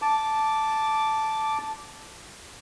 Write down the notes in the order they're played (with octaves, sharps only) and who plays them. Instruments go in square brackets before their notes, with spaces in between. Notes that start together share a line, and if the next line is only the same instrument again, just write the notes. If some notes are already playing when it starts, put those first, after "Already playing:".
[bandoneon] A5 D6